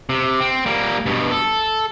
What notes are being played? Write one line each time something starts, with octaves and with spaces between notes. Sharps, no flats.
C3
C4
G3 A#3
G2 B2
A4